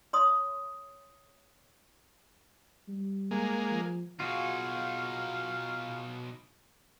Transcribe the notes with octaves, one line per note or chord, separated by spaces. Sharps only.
C#5 C6 D#6
G3
G#3 A#3
F3
B2 D#4 F4 F#4 G#4 F5